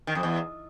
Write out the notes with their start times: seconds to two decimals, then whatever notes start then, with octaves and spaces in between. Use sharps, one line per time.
0.07 D#3
0.15 F2
0.23 E2